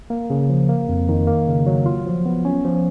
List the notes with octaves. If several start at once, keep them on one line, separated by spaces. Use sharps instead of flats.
A#3
C#3
F3
A#3
F2
D#3
A#3
C#3
F#3
F4
F3
B3
C#4
F3